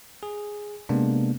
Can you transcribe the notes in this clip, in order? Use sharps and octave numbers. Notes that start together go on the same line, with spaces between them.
G#4
C3 G#3 A#3 B3 D4